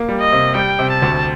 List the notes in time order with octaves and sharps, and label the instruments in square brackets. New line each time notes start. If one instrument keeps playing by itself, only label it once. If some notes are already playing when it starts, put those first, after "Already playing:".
Already playing: [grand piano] A#3
G3
[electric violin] D#5
[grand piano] C3
[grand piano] G3 [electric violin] G5
[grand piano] C3
[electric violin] A5
[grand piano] D2